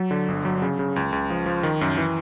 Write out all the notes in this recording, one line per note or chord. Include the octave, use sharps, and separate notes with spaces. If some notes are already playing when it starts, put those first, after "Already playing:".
Already playing: F#3
D3
G1
F#3
C#3
C#3
C#2
C#2
F3
F3
D#3
F#2
E3